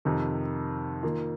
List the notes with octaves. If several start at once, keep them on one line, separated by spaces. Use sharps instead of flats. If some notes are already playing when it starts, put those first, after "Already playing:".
F2 C3 D#3
D#3 A#3 F4